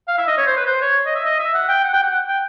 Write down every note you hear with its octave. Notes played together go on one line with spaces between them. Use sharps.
F5
E5
D#5
C#5
C5
B4
C5
C#5
D#5
E5
D#5
E5
F#5
G5
F#5
G5
F#5
G5